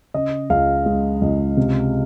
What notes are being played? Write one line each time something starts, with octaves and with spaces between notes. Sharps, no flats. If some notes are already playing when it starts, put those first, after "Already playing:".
C#3 D#5
C#2 F5
G#3
C#2
C3